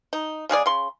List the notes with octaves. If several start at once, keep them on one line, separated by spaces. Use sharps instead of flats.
D#4
C#3 G#3 G#4 D5
C#3 C6